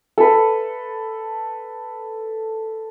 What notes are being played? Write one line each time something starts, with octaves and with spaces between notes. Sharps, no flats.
A4 B4